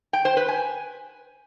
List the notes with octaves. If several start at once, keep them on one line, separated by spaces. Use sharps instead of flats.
G5
C5
B4
G#5